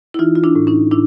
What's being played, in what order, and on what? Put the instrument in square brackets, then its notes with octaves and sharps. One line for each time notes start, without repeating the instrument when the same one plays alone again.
[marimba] E4
E3 D#4 F4
F4
D4 E4
A2
C#4 D#4
A2 D4 E4